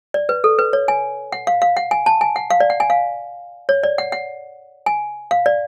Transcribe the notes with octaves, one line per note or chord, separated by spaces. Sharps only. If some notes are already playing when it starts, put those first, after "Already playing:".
D5
B4
A4
B4
C#5
G#5
F#5
F5
F5
F#5
G#5
A5
G#5
F#5
F5
D5
F#5
G#5
F5
C#5
D5
F#5
F#5
G#5
F5
D5